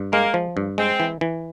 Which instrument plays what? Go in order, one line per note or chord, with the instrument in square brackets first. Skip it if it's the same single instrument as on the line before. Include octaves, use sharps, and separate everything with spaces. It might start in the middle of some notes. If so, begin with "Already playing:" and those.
Already playing: [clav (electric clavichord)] G2
[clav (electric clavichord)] G#3 [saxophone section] A#3
[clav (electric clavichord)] F3
G2
[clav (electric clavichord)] G#3 [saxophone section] C4
[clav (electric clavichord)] E3
E3